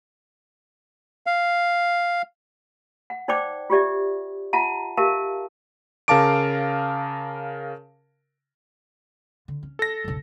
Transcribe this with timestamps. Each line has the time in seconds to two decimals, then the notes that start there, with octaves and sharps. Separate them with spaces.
1.27 F5
3.10 F#5
3.28 D#4 C5 D5 G5 D6
3.70 F4 G4 D5 E5
4.53 F4 E5 F#5 A5 A#5
4.97 G4 A#4 E5 F5 A5
6.08 C#3 A#4 F5 A5 D6 D7
9.48 D3
9.63 C#4
9.79 A4 A#6
10.04 F#1 B1